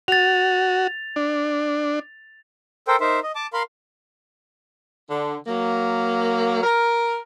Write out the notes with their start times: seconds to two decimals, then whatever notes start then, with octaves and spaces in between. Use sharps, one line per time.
0.08 F#4 A6 F7
1.16 D4
2.88 A4 A#4 C5 G5
3.00 D#4 A#4 C5 E5
3.23 D#5
3.35 A5 D6
3.53 A#4 F5 B5 C6
5.10 D3
5.46 F#3 A#3
6.63 A#4